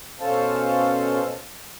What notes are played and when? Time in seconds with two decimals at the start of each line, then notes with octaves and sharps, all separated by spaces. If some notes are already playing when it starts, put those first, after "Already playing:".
0.21 B2 C#4 A4 C5 F5 A5